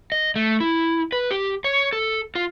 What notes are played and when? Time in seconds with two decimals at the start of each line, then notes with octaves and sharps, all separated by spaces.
0.12 D#5
0.36 A3
0.60 E4
1.12 B4
1.31 G4
1.64 C#5
1.93 A4
2.35 F4